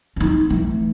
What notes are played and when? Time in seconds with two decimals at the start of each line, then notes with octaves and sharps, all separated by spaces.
0.16 D4 D#4
0.50 E3 A3